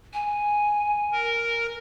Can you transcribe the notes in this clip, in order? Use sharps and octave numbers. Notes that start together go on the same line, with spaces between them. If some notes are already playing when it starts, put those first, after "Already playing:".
G#5
A#4